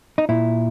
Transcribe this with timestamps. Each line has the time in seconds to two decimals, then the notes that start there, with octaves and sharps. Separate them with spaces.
0.18 D#4
0.29 A#2 E4